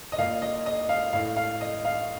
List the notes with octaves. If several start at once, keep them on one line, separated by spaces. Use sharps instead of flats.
D#5
A#2 F5
D#5
D#5
F5
A2 F5
F5
D#5
F5